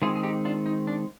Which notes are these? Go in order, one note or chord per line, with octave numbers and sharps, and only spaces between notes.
D#3 G#3 C4 F4 G#4
G#4
D#4 G4
D4 F4
D#4
D4